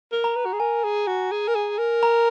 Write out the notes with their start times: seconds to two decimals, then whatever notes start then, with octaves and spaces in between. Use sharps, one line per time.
0.12 A#4
0.24 A#5
0.36 B4
0.46 F#4
0.53 G#4
0.60 A#4 G#5
0.84 G#4
1.07 F#4
1.32 G#4
1.48 A#4
1.55 G#4
1.78 A#4
2.03 A#5